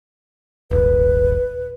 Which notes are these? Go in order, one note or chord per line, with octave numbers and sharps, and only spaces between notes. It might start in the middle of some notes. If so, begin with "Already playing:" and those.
D#1 G#1 B4